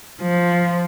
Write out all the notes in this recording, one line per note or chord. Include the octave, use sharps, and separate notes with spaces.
F3